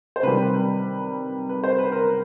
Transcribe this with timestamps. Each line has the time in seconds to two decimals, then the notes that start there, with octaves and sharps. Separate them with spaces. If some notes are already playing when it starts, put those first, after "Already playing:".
0.16 C5
0.23 C3 D#3 G3 B4
1.49 B4
1.64 C5
1.79 B4
1.92 A#4